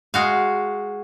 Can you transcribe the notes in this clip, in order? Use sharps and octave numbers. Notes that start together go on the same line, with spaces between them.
G#3 F#4 F5